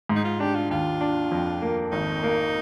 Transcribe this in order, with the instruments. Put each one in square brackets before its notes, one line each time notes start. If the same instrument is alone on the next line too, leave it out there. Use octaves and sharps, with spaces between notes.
[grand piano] G#2
[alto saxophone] D#4
F4
[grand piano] D4 [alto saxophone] G4
[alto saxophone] F4
[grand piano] D#2 [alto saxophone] F4
[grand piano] D4
F2
A#3
[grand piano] G#1 [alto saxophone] D#4
[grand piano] A#3